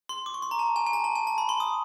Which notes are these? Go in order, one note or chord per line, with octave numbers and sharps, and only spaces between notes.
C6
D6
C#6
C6
A#5
A5
G#5
G#5
A5
A5
G#5
A5
B5
C6
D#6